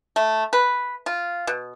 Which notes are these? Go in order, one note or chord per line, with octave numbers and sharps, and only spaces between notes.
A3
B4
F4
B2